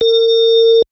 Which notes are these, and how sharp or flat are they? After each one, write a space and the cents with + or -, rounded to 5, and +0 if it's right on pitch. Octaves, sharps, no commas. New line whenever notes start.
A#4 -40